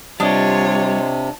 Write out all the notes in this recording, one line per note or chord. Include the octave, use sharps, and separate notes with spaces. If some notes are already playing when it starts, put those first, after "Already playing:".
C3 G3 D4 F4 C#5 D#5